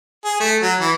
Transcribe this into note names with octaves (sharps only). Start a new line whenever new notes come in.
G#4
A3
F#3
E3